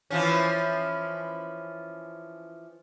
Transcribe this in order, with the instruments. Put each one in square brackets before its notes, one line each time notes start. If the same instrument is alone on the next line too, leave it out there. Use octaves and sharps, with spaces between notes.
[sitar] E3 F3 C#4